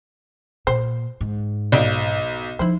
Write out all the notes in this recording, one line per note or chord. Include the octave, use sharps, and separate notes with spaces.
A#2 C5
G#2
B1 F3 D5
F3 D#4 E4 C5